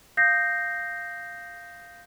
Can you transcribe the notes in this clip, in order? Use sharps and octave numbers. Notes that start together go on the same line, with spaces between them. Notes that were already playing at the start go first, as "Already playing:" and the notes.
F5 D#6 G6 A#6 C7